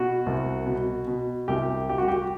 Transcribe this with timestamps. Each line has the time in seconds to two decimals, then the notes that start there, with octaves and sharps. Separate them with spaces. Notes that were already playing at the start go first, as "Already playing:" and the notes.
Already playing: B2 F#4
0.26 C2
0.66 B2
1.07 B2
1.48 C2 G4
1.89 G3 G4
1.98 F#4
2.08 G4